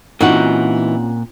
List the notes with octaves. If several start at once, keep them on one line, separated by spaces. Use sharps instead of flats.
A#2 E3 C4 C#4 D#4 F4 F#4 F#5